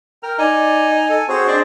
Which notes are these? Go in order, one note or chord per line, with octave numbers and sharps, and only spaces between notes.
A#4 G5 F6
D#4 D5 G#5
A4
C4 F#4 G#4 C5 C#5
C4 D4 D5 D#5